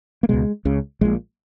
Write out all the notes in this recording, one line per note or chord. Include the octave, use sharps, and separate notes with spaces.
A#3
C#2 B2 G#3
C#2 C#3
A#1 A#2 G#3